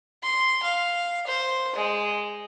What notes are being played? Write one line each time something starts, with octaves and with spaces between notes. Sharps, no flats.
C6
F5
C5
G#3